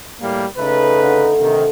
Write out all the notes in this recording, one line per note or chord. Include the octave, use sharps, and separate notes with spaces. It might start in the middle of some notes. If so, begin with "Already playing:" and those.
A2 G3 A#3
C#3 A3 D#4 A4 B4
D3
C3 D#3